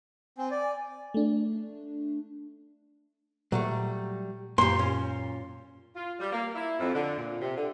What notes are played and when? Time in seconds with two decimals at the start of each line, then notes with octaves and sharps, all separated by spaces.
0.38 C4 G#5
0.51 D5
1.14 A3 D4
3.52 A#2 F#3 G3 A3
4.58 F#2 A#2 F#3 A#3 G4 C6
4.79 C#4
5.96 F4
6.20 G3
6.33 A#3
6.55 E4
6.80 F2
6.94 D3
7.18 A#2
7.41 C3
7.57 D3